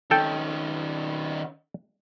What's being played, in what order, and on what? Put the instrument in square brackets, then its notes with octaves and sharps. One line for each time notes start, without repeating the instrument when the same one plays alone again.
[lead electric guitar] D#3 C#4 [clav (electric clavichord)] A4 G5